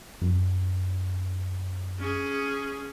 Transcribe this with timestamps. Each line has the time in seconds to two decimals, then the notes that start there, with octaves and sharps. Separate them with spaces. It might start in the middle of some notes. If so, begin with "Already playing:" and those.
0.22 F#2
1.99 C#4 G#4